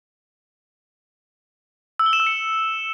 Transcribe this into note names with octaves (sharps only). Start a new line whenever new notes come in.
E6
G7
E7
E6
C#7